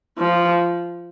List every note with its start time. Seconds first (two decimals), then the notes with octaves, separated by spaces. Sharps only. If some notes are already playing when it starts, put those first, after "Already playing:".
0.18 F3